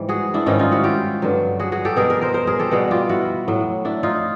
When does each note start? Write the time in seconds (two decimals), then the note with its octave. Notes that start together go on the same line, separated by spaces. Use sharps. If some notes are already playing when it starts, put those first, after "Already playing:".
Already playing: G#2 E3 G3
0.09 F#4 G#4
0.34 D4 E4
0.46 G#2 D#3 G3 C#4 D#4
0.59 D#4 F4
0.72 E4 F#4
0.84 F4 G4
1.22 G2 D3 F#3
1.60 F#4 G#4
1.72 F#4 G#4
1.85 G4 A4
1.96 B2 G3 G#4 A#4
2.10 G#4 A#4
2.21 A#4 C5
2.34 A#4 C5
2.47 G#4 A#4
2.59 G4 A4
2.71 B2 G3 F#4 G#4
2.91 F4 G4
3.09 E4 F#4
3.48 A2 F#3
3.85 D4 E4
4.03 D#4 F4